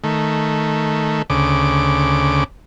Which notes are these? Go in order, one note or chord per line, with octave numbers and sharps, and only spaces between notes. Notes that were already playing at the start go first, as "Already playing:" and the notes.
D#3 A3
D2 C#3 D6